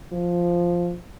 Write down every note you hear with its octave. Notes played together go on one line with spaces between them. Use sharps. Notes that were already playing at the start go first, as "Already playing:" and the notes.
F3